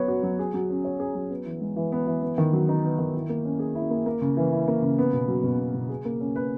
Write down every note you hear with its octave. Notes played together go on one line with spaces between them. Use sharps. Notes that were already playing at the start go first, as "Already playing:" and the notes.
Already playing: F#3 B3 C#5
F#4
F#3
G#4
F#3
C#4
C#5
G#4
F#3
B3
E3
G#3
E3
B3
E3
B3
D#3
F#3
D#4
B3
D#3
E4
A#3
C#4
G#4
E4
A#3
A#3
C#3
E3
E4
A#3
C#3
B3
B2
F#3
B2
B3
B2
G#4
A#3
C#4
B4